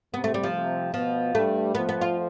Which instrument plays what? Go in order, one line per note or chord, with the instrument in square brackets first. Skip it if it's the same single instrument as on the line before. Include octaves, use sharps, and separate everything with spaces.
[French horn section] C3 [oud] B3
[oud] A3
G3
F3
[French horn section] C3
[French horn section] B2 B3 [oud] F3
[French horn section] G2 G3 [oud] A3
[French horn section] F2 F3 [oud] B3
[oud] B3
F4